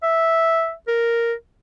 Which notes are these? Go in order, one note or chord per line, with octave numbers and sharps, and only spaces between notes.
E5
A#4